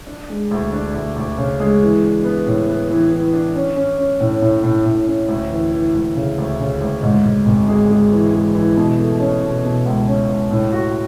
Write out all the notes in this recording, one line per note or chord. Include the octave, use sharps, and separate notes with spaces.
D4
G#3
D2
D4
D2
D2
C#3
G#3
E3
D4
B3
A2
B3
E3
E3
D4
C#4
C#4
C#4
A2
A2
A2
A2
C#4
D2
E3
E3
D2
C#3
D2
C#3
D2
G#2
G#2
G#1
G#3
G#3
E3
G#3
E3
B2
A3
C#4
B2
B2
C#2
C#4
C#2
A2
F#4